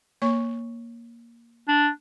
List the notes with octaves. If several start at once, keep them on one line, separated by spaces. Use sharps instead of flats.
A#3 C#5 C#6
D4